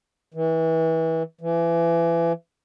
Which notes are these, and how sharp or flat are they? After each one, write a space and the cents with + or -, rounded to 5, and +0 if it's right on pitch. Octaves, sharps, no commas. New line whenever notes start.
E3 -25
E3 +30